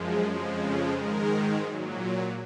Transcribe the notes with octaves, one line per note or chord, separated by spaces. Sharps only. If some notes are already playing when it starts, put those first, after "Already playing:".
Already playing: F#2 F3 G#3
F2 C#3 F3 G#3
G#2 D#3 G#3 A#4
A#2 F#3